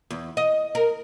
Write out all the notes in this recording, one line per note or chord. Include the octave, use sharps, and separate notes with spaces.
E2
D#5
A#4